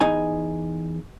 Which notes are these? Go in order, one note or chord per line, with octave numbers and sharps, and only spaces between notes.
E2 D#4 G#5